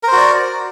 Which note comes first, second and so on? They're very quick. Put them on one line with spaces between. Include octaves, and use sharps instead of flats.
A#4 C5 F#4 D5